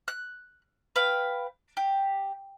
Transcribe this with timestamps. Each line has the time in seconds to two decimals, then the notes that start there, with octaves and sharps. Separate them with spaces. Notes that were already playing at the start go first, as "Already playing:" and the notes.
0.08 F#6
0.96 B4 F5 G5
1.77 G4